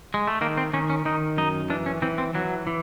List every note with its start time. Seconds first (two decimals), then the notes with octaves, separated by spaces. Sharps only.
0.14 G#3
0.27 A3
0.41 D#3 A#3
0.57 C4
0.73 D#3 C#4
0.90 C#4
1.05 D#3 D#4
1.37 F#2 D#4
1.70 E3 D4
1.86 C#4
2.02 E3 C4
2.18 C4
2.34 E3 F#3
2.67 E3